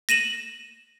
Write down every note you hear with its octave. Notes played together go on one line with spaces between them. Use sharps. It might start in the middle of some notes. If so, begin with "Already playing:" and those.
A#6 D#7 E7 F#7